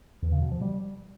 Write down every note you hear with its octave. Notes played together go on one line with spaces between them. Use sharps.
E2
C#3
B2
F3
G3